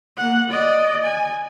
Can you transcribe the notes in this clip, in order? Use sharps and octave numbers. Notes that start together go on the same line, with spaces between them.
A#3 F#5
D5 D#5
G#5